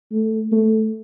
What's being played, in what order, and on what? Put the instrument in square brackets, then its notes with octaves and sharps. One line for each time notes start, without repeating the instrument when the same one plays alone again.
[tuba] A3
A3